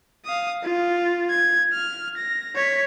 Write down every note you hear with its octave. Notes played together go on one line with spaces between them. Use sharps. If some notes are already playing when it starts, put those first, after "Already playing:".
F5 D#6
F4
G#6
F6
A#6
C#5 B6